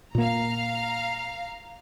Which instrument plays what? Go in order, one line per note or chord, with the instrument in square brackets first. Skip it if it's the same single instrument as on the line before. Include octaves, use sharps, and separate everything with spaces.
[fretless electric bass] A#2 A#3 [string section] F5 A#5